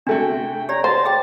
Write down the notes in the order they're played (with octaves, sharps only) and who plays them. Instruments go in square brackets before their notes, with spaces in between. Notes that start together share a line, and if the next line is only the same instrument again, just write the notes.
[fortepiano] C3 A3 F#4 [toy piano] D4 [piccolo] G5
[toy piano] G4 C#5 D5 [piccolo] A#5
[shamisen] C5 [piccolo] A6
[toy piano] G#4 G5